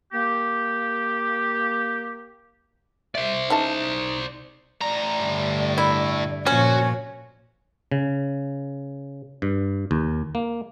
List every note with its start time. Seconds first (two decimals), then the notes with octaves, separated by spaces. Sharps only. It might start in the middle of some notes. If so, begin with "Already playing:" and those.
0.13 A#3 G4
3.15 C5 D5 E5
3.50 C#3 E3 D#4 A5
4.81 A2 D5 A#5
5.21 G2 D3
5.78 E4
6.47 A#2 F3 C#4 F#4 C#5
7.92 C#3
9.42 G2
9.91 D#2
10.35 A#3